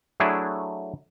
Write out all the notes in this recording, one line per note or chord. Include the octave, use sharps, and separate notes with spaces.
F#3 A3 D4 E4 G#4